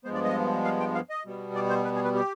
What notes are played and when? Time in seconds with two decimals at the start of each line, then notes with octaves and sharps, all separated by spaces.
0.04 G2 F3 G#3 B3 C5
0.15 D5
0.24 D#5
0.65 F5
0.80 G5
0.95 F5
1.10 D#5
1.25 B2 G3 B3
1.55 D5
1.70 C5
1.85 B4
1.95 G#4
2.05 B4
2.15 G4